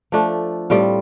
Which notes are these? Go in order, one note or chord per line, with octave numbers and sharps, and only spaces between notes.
F3 A3 D4
A2 G3 C4 F4